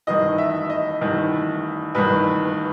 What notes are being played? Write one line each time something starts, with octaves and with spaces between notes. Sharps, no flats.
A1 G2 D#3 D#5
E5
D#5
A1 G2 D#3
A1 G2 D#3 B4